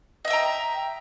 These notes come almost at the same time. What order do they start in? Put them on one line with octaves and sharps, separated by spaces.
D#5 E5 G5 A#5